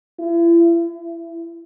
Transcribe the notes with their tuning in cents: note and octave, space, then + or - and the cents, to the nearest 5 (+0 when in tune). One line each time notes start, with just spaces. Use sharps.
E4 +40
E4 +20